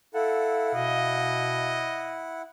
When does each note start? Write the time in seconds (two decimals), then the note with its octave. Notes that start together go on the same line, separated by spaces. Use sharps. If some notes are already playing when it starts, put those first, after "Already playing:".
0.14 E4 A4 F5 F#5
0.74 B2 D#5